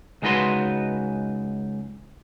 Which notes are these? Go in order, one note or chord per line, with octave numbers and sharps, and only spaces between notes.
C#2 G#3 D#4 F#4 B4 C6